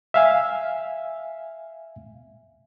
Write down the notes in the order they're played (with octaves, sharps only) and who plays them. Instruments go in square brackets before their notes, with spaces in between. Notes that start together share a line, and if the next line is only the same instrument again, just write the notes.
[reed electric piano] E5 F5 G#5